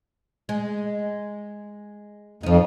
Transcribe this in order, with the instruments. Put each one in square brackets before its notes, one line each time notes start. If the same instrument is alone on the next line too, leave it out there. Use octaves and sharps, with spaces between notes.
[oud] G#3
[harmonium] F2 [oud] F3 D#4